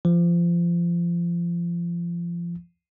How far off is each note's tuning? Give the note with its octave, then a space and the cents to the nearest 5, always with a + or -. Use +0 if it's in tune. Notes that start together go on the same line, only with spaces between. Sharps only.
F3 -25